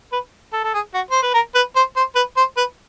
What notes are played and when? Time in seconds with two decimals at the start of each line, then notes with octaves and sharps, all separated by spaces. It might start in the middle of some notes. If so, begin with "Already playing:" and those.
0.12 B4
0.53 A4
0.64 A4
0.74 G#4
0.94 F#4
1.11 C5
1.23 B4
1.34 A#4
1.55 B4
1.76 C5
1.96 C5
2.16 B4
2.37 C5
2.57 B4